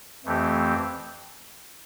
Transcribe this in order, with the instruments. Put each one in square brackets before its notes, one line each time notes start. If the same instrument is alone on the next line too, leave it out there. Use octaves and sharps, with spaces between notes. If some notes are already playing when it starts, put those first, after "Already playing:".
[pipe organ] F2 E3 A3 C4 G4